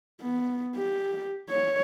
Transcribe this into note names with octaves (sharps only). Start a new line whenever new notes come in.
B3
G4
C#5